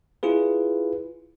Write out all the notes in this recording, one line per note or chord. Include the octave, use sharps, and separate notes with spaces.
E4 F4 G#4 B4